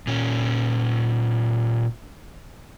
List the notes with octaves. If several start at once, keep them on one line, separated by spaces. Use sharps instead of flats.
A#2 C#4